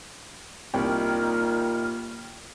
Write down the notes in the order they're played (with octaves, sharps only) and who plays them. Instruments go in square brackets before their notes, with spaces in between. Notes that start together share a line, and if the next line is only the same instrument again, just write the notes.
[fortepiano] C2 [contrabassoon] A#2 [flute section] D#4 F6 [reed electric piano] G5